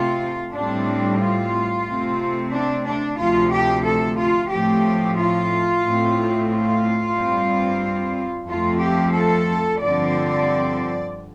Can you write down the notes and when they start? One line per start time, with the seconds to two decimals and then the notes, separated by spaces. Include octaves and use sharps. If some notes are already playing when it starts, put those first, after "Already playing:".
Already playing: C3 A3 C4 F4
0.53 A2 G3 C4 D4
1.20 F4
1.86 C3 A3 C4
2.52 D4
2.85 D4
3.18 D2 C3 F3 F4
3.51 G4
3.85 A4
4.18 F4
4.50 A2 F3 A3 C4 G4
5.17 F4
5.84 A2 A3 C4
6.49 F4
7.16 G2 G3 C4
8.49 F2 F3 A3 C4 F4
8.81 G4
9.14 A4
9.81 G2 D3 F3 C4 D5